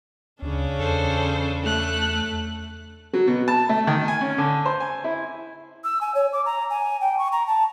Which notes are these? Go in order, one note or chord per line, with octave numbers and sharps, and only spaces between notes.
D2 C#3 C#4 D4
E2 A4 C5
A3 F#6
F#3
B2
A5
A3
D#3
G#5
C#4
D3
C5
G#5
E4
E6
G#5
C#5
D6
A#5
G#5
G5
C#6
A#5
A5